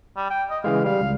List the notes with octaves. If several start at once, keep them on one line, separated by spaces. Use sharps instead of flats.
G3
G5
D#5
C#3 E3 G#3 F5
G3 F5
C#2